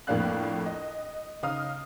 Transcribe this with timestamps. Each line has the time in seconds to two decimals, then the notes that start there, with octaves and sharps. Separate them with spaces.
0.07 F2 A2 A#3 D4 F5 F#6
0.66 D#5
1.43 C#3 D#4 F5 D#6 F6